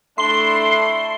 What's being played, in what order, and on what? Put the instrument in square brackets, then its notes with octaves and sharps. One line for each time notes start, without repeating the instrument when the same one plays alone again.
[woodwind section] A3 D4 [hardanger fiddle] E4 [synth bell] C6 G7 [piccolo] C7